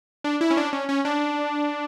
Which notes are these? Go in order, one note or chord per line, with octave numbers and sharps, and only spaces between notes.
D4
E4
C#4
D4
C#4
C#4
D4